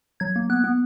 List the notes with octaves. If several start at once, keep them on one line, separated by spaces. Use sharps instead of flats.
F#3 G#6
A#3
B3 F#6
B3